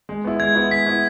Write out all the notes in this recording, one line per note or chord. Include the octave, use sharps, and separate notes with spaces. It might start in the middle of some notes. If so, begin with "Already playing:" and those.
G#3
B3 E4
G#3 G#6
B3 E4
G#3 B6
B3 E4